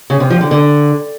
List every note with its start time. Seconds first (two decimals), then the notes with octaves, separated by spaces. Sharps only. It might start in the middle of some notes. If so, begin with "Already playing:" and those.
0.10 C#3
0.20 C3
0.30 F3
0.41 D3
0.51 D3